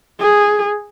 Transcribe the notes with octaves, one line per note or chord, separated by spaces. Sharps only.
G#4